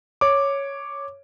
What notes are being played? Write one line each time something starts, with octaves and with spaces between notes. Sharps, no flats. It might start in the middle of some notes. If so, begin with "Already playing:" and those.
C#5 D6